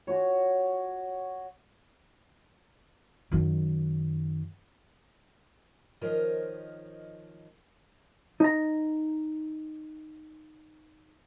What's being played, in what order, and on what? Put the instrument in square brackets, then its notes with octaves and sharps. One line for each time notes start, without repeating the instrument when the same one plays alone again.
[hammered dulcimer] F#4 C#5
[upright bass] F#2 D#3
[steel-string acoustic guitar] D#3 F3 A#4 C5 C#5 D#5
[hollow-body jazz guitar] D#4 A#5